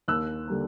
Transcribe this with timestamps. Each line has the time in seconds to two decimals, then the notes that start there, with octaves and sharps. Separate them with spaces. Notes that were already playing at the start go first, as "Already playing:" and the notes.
0.08 D#2 E6 F#6
0.48 D3 G3 A#3